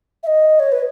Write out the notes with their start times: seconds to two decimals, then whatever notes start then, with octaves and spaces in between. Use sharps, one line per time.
0.23 E5
0.27 D#5
0.59 C#5
0.71 B4